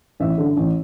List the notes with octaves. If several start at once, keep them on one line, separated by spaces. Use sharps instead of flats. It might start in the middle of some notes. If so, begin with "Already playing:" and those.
A1 E5
G2 D3
A1